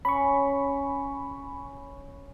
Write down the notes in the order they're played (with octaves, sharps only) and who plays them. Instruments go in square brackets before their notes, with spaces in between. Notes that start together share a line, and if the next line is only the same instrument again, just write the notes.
[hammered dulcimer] C#4 [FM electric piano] B5 C#6